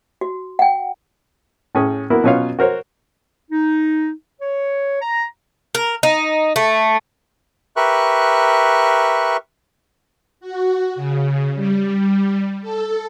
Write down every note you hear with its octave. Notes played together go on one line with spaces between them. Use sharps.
F#4
F#5 G5
A2 C#4 G#4
A#3 B3 E4 F#4 A#4
B2 F#3 C#4 F4 C#5 F5
F#4 A#4 C5 C#5
D#4
C#5
A#5
A#4
D#4
A3
G4 A#4 B4 E5 C#6 F#6
F#4
C#3
G3
A4